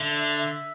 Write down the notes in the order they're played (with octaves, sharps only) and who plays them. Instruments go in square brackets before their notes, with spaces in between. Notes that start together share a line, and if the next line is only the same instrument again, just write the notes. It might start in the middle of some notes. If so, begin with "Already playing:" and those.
Already playing: [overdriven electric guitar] D3 [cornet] E5
[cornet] E5